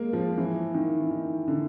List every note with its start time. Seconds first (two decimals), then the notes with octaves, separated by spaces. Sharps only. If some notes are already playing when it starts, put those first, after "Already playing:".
Already playing: G#3 A#3
0.13 F3
0.37 E3
0.74 D#3
1.00 E3
1.11 D#3
1.48 D3